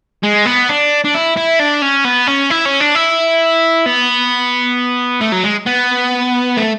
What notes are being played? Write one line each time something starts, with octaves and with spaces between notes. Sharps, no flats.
G#3
B3
D4
D4
E4
E4
D4
C#4
B3
C#4
E4
C#4
D4
E4
B3
A3
F#3
G#3
B3
A3